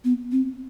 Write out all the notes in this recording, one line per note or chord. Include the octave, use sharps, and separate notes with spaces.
B3
C4